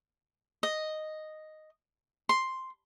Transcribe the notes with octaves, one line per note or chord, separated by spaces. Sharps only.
D#5
C6